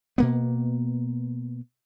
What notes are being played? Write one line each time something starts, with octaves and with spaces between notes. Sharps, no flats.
B2 A#3 B3